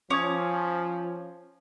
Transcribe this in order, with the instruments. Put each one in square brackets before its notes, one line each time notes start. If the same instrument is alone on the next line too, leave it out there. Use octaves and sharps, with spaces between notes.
[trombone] F3 [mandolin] C#4 [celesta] D6 D#6 G#6